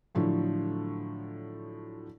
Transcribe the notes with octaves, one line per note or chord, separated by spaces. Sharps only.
A2 D3 F3 F#3